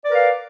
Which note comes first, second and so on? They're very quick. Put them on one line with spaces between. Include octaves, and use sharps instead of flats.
D5 B4 A#4 F5